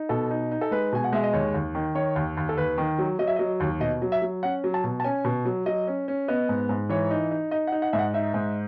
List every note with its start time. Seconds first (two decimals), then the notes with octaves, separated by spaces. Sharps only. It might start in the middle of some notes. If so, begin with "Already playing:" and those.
Already playing: D#4
0.09 B2 A4
0.30 D#4
0.51 D#4
0.61 A4
0.71 G#3 B4
0.93 B2 G#5
1.04 F#5
1.13 G#3 E5
1.24 D#5
1.33 D#2 C#5
1.54 D#2
1.75 D#3
1.95 D#3 C#5
2.16 D#2
2.37 D#2
2.49 A4
2.57 D#2 B4
2.78 D#3
2.99 F#3
3.19 F#3 D#5
3.27 E5
3.36 F#3 D#5
3.60 D#2
3.80 B2 D#5
4.02 F#3
4.12 E5
4.22 F#3
4.43 C#4 F#5
4.64 F#3
4.74 A5
4.84 B2
5.00 A5
5.04 C#4 G#5
5.25 B2
5.45 F#3
5.66 F#3 D#5
5.87 C#4
6.08 C#4
6.28 B3 D#5
6.49 G#2
6.69 G#2
6.89 E3 C#5
7.11 D#4
7.31 D#4
7.51 D#4 D#5
7.67 F#5
7.72 D#4
7.82 F#5
7.93 G#2 E5
7.99 F#5
8.14 D#4 E5
8.34 G#2